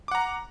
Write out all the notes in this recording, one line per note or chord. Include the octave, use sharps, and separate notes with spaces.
F#5 A#5 D6